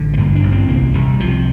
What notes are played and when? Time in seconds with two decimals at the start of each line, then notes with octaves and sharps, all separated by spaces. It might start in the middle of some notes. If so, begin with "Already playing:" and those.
Already playing: A1 D3
0.14 A3
0.18 G2 A#3
0.35 D4
0.43 A1
0.52 C4
0.69 C2 A#3
0.94 C2 G3
1.20 C3 F3